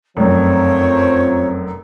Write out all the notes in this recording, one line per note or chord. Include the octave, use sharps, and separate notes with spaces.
F1 F#2 F3 C4 C#5